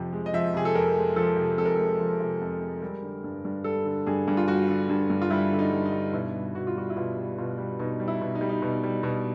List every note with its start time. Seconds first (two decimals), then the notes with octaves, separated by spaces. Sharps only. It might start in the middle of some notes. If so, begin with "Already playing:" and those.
Already playing: F2 C3 F3
0.13 G#3
0.26 D#5
0.33 F3 E5
0.54 C3 G#4
0.65 A4
0.75 F2 A#4
0.95 G#3
1.16 F3 A4
1.36 C3
1.58 F2 A4
1.66 A#4
1.75 G#3 A4
2.00 F3
2.20 C3
2.41 F2
2.62 G#3
2.82 G3 A#4
3.02 D3
3.24 G2
3.45 G2
3.64 G3 A4
3.85 D3
4.07 G2 G#4
4.28 G2
4.37 F4
4.48 G3 F#4
4.68 D3
4.89 G2
5.10 G2
5.22 F4
5.30 G3 E4
5.52 D3
5.59 D#4
5.72 G2
5.85 D#4
5.93 G2
6.13 B2 E4
6.34 G3
6.55 B2 F#4
6.67 F4
6.76 G3 F#4
6.90 E4
6.96 B2 F4
7.17 G3
7.38 B2 F4
7.58 G3
7.79 B2 D#4
8.00 G3
8.08 E4
8.21 B2
8.35 D#4
8.41 G3
8.49 D#4
8.62 B2
8.84 G3
9.03 B2